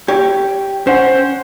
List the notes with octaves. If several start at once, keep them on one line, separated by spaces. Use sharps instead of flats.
G4 C#5
C#4 C5 F#5